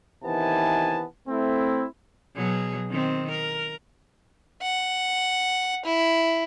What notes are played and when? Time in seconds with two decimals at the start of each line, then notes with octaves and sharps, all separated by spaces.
0.25 C3 D#3 E3 B3 G#5 A5
1.28 A3 C4 E4
2.35 B2 F#3 G#4
2.90 D#3 C4
3.31 A#4
4.62 F#5
5.85 E4